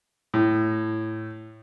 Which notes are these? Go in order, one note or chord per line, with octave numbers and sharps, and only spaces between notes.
A2